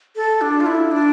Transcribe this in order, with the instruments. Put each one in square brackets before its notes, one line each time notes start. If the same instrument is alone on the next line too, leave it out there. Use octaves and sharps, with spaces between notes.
[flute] A4
D4
F4
E4
D4